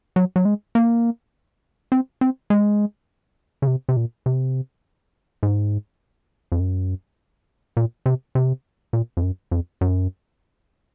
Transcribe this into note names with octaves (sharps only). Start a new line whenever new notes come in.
F#3
F#3
G#3
A#3
C4
C4
G#3
C#3
C3
C3
A#2
C3
G#2
F2
F#2
A#2
C3
C3
A#2
F2
F#2
F2
F#2